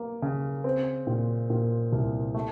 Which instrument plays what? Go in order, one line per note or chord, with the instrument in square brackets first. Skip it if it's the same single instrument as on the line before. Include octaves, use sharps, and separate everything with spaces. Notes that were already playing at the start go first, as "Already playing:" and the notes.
Already playing: [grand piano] A#3
C#3
C4
A#2
A#2
C2
A3